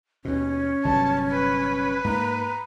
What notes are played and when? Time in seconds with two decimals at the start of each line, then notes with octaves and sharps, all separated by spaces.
0.25 D#2 B2 C#4
0.85 G1 C3 F#3 A5
1.32 B4
2.04 G#2 A#3 A#5